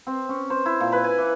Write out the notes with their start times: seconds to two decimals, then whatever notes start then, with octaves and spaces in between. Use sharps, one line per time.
0.07 C4
0.29 C#4
0.50 C5
0.66 E4
0.81 A#2
0.92 B4
1.04 G#5
1.18 E3